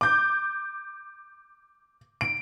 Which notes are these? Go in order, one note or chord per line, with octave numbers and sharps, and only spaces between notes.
D6 G6
D7